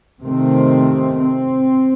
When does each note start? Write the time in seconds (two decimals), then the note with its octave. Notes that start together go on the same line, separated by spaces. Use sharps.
0.25 C3 D#3 A3 C4
1.18 C4